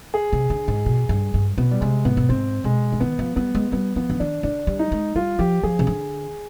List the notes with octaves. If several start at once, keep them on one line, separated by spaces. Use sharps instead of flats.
G#4
C3
D3
G#2
B2
G2
G2
B2 B3
G3
C3 G#3
G#2 B3
B2
G#2 C4
B2 G#3
D3
D#3 B3
F3
G3 B3
G#3
G3 B3
F3 B3
D3
D#3 D4
D3 D4
G3
D#4
G#3
G3 F4
F3 G4
F3 G#4
C3
D3